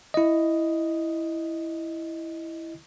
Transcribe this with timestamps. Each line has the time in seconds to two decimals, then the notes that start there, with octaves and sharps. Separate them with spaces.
0.14 E4 D#5